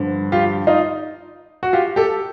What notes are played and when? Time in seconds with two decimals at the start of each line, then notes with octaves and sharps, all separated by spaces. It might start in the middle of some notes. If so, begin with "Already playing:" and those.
Already playing: G2 D3 F3
0.32 F4 G4
0.67 D#4 F4
1.63 F#4
1.73 F4 G4
1.96 G4 A4